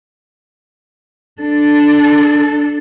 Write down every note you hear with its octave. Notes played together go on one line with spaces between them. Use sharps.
D4 A4